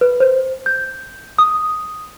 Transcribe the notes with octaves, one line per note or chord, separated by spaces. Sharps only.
B4
C5
G6
D#6